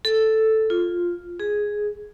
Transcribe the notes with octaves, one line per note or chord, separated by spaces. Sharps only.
A4
F4
G#4